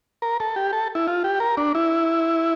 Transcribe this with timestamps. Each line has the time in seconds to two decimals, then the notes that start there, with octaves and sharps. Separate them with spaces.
0.22 A#4
0.40 A4
0.56 G4
0.73 A4
0.95 E4
1.08 F4
1.24 G4
1.40 A#4
1.57 D4
1.75 E4